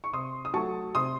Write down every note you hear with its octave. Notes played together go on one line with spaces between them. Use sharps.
C#6
C3 C6 D#6
D#6
F#3 A3 A5 C#6
C3 C6 D#6